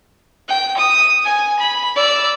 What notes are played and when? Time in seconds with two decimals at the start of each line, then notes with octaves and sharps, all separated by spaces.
0.48 G5
0.78 D#6
1.25 G#5
1.59 B5
1.96 D5 E6